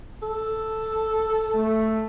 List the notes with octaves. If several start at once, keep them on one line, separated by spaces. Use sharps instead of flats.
A4
A3